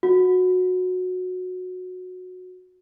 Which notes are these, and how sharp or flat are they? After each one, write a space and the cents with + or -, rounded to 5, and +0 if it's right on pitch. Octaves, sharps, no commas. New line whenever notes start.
F#4 -15